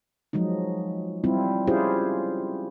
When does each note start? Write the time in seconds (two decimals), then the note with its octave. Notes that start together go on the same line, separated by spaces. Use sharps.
0.33 F3 F#3 G#3 D#4
1.24 G3 C4 E4 F4
1.67 C#4 E4 F4 G4 G#4 C5